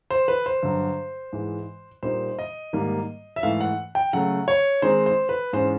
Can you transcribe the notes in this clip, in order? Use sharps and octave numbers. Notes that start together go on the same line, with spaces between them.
C5
B4
C5
G2 D3 F#3
G#2 E3 G#3
A#2 G3 A#3 D#4 C5
D#5
G#2 D#3 G3 A#3
E5
G#2 E3 A3 F5
F#5
G5
C#3 F#3 A3 F#5
C#5
D#3 G#3 C4 D#4 C5
C5
B4
G#2 E3 G#3 C#4 C5